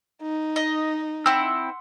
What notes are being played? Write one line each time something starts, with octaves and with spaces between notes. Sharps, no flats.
D#4
D#5
C4 E4 F#5 C6 E6